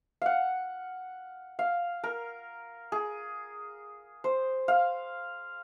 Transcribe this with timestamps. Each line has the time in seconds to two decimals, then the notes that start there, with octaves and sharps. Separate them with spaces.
0.22 F5 F#5
1.59 F5
2.04 A#4
2.92 G#4
4.24 C5
4.68 F5